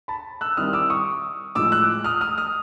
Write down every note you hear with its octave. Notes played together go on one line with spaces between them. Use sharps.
A5 B5
E6 F#6
D#3 G3 C4 E4 D#6 F6
D6 E6
C#6 D#6
A2 F3 G#3 D6 E6
E6 F#6
D#6 F6
D#6 F6
D#6 F6